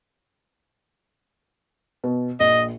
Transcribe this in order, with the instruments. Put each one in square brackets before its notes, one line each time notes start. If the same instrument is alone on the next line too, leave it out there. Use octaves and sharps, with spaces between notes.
[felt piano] B2
[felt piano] A#1 [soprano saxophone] D#5